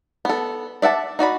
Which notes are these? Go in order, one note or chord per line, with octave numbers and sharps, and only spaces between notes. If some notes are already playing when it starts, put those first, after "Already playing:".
B3 A4
D5 E5 F#5 A5
D#4 F#4 D5 B5